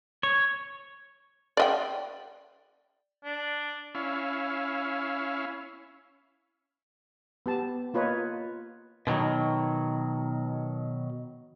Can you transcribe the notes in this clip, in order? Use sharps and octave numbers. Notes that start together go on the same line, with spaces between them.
C#5
D5 D#5 G5
D4
C#4 E4 F5
B3 G4 A5
A#3 F4 B4 C#5 D#5 A#5
B2 D3 D#3 F#3